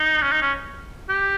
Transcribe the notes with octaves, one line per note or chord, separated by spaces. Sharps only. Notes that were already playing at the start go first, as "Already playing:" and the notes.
Already playing: D#4
C#4
D#4
C#4
G4